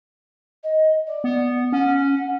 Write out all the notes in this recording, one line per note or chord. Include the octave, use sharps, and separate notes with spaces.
D#5
D5
B3
C#4 F#5